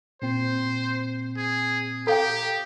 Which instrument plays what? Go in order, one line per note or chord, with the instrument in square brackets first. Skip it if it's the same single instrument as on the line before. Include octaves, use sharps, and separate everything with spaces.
[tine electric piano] A#2 C4 [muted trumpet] C5
[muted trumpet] G#4
[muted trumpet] G4 [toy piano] A4 F5 G5 [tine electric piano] A#5 G6